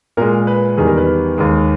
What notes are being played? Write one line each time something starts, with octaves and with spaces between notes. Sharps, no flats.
A#2 G#3 A#4
B4
E2 D#3 G3 G#4
A#4
B4
D#2 D#3 G#3